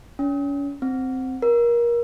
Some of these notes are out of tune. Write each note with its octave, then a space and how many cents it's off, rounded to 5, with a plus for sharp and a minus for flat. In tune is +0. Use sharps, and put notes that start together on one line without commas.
C#4 +35
C4 -5
A#4 +25